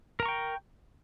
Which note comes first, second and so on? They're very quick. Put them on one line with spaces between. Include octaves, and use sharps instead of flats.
A#4 A#5 C#6 G5